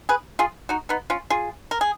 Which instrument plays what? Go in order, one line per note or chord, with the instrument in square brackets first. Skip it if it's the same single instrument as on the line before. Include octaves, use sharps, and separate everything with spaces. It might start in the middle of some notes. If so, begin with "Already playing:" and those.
[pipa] G#4 B4
F4 G#4
D#4 F#4
B3 D#4
C#4 F4
F4 G#4
A#4
G#4